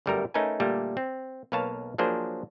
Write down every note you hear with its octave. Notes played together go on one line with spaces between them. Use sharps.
G1 F#2 G3 A3 A#4 A#5
A3 C#4 D#4 A#4 B4 G#5
A#2 D3 G3 A3 A#3
C4
B1 A#3 B4 C#5 F5 A5
F3 F#3 A#3 D4 G#4 C5